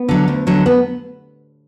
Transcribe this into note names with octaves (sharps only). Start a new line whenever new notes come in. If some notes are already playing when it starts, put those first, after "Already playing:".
Already playing: B3
D3 F#3
D2
D3 F#3
B3